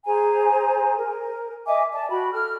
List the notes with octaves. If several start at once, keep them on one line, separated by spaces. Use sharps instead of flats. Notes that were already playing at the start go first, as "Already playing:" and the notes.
G#4 C5 G#5 A#5
A#4
D#5 E5 G#5 D6
D5 A5
F#4 G5 B5
A4 F6